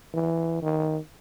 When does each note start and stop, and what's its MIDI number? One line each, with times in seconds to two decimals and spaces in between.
0.14 0.59 52
0.62 0.98 51